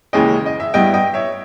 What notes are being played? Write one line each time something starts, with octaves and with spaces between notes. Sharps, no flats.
D#2 C#3 E3 G#3 C#4 D#5 G5
D#5
E5
G2 G3 B3 E4 D#5 G5
D#5 G5
C#5 E5